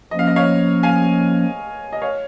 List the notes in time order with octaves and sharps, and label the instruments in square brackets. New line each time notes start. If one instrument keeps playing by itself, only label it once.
[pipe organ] F3 A#3 C#4 [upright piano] D#5
[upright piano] F5
D#5
C#5 F5
F5 G#5
D#5
C#5 F5